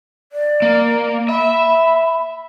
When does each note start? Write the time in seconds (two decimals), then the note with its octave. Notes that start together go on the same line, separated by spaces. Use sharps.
0.32 D5
0.62 A#3
1.29 E5 B5